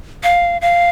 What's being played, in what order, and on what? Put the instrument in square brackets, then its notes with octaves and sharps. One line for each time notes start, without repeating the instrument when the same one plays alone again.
[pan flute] F5
F5